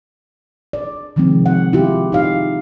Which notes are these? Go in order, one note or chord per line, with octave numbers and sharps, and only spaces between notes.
D5
C3 D#3 F3 G#3 C4
F#5
E4 F4 G4
D#4 G4 F5